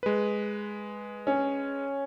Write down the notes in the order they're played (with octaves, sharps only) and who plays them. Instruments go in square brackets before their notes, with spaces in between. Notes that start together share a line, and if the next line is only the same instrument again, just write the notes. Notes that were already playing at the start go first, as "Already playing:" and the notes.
[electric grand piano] G#3 B4
[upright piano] C#4